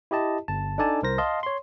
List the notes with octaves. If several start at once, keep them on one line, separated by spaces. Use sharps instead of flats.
E4 G4 D#5 A5
G1 A5
D4 D#4 A4 D5 G#5 A5
C2 A#4 C5 A#6
D#5 F5 A5 C6
C#5 C6